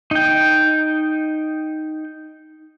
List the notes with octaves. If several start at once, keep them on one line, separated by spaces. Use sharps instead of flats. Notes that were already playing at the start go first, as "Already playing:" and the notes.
D#4 G5